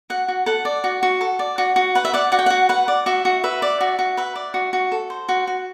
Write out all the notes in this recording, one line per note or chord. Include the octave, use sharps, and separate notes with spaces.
F#4 F#5
F#4
A4 F#5
D5
F#4
F#4
A4
D5
F#4
F#4
B4 F#5
E5
D5 F#5
F#4 F#5
G5
F#4 F#5
B4 F#5
D5
F#4 E5
F#4
B4 E5
D5
F#4
F#4
B4 E5
D5
F#4
F#4
A4
C5
F#4
F#4